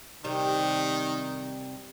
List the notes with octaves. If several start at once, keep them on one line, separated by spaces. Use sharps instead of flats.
C3 D#3 G3